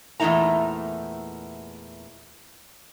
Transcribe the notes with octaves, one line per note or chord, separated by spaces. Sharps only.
E2 A#2 A3 D#4 E4 A#5